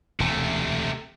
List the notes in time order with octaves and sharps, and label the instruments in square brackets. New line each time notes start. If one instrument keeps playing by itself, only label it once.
[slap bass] E1 D2 [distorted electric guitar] C3 A3